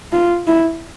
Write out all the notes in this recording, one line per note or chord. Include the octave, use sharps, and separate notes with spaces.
F4
E4